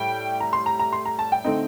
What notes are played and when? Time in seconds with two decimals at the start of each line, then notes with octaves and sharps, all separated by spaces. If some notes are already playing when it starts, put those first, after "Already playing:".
Already playing: A2 G3 G5
0.40 A#5
0.53 C6
0.66 A#5
0.79 A#5
0.93 C6
1.05 A#5
1.19 A5
1.32 G5
1.44 D3 A3 C4 D#4